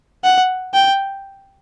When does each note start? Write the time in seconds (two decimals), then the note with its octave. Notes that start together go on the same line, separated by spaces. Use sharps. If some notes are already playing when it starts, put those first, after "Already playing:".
0.24 F#5
0.74 G5